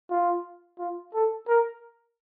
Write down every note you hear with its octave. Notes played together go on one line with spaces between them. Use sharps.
F4
F4
A4
A#4